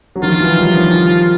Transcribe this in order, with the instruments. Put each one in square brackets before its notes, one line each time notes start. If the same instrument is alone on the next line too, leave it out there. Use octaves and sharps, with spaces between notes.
[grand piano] F#3
[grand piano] D#3 F3 [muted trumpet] F4
[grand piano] E3 F#3
F3 G3
D#3 F3